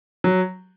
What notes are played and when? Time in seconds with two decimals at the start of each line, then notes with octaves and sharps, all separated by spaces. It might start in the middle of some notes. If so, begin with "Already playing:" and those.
0.24 F#3